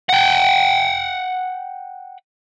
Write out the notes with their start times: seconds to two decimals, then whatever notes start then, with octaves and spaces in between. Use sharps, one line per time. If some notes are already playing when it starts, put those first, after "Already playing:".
0.10 F#5 G5